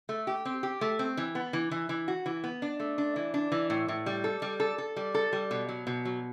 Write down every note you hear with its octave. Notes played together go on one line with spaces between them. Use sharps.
A3
G4
C4
G4
A3
C4
E3
B3
E3
E3
E3
F#4
E3
B3
D4
A3
D4
E3
D4
E3
A2
A2
G3
A4
G3
A4
A4
G3
A4
G3
B2
F#3
B2
F#3